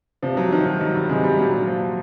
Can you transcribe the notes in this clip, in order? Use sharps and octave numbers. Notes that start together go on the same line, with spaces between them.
C3 F3
F#3
D#3 F3
F#3
D#3 F#3
G3
C3 G#3
G3
A#2 F#3
F#3
F3